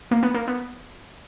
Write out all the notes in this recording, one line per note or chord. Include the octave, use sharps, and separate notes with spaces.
A#3
B3
A#3
B3